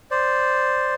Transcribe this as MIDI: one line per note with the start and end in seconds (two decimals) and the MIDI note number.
0.11 0.94 72
0.11 0.94 74